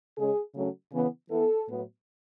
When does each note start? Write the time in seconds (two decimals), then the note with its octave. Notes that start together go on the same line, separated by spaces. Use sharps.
0.17 C#3 G#3 C#4 G#4
0.54 C#3 F#3 A3 C#4
0.93 C#3 E3 B3
1.31 E3 B3 A4
1.69 A2 F#3 B3